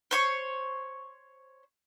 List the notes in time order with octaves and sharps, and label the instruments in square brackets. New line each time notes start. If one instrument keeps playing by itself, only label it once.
[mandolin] C5 C#5 C#6